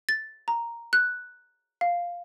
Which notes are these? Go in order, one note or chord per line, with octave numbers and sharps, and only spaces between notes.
A6
A#5
F#6
F5